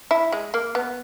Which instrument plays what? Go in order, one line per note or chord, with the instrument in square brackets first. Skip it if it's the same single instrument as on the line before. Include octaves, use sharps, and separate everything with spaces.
[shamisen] E4
G#3
A#3
B3